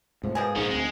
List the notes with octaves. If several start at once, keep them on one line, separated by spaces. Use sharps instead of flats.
G#2 C3 F3 A3
G#2 B2 F3 A#3 G#4
A#1 G#2 D#3 C#4
D2 G#3 C4